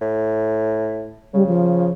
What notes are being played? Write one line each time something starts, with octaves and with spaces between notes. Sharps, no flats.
A2
C#3 G3
F3